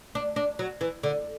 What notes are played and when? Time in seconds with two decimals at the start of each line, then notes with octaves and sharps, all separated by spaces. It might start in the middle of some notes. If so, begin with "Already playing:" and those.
0.15 D4
0.36 D4
0.59 F#3
0.81 E3
1.03 D3